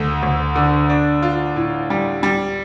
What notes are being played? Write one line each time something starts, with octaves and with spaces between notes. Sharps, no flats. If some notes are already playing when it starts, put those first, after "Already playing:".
Already playing: D2 A3
D2
D3
D4
F4
A2
G3
G3